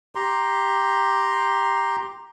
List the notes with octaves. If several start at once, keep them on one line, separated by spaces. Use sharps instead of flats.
G4 A#5 C6